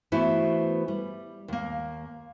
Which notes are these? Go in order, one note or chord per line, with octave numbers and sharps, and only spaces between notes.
E3 A3 B3 E4 F#4 C5
G3
D#2 A#3